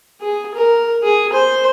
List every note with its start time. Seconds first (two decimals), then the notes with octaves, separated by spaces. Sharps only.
0.21 G#4
0.55 A#4
1.03 G#4
1.33 C5